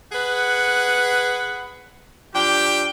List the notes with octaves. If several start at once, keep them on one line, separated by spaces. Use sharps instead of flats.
G#4 B4 F#5
F3 D4 G4 G5